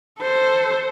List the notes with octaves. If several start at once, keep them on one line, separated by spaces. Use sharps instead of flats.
A4 C5